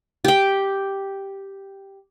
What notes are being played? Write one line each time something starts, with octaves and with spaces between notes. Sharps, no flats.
G4 G5